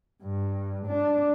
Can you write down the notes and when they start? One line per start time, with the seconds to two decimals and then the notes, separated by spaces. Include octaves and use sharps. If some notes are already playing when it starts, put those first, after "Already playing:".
0.22 G2
0.86 D4